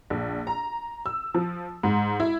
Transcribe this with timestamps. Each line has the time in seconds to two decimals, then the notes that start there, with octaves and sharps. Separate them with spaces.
0.10 A#1
0.47 A#5
1.06 E6
1.34 F3
1.83 G#2
2.20 E4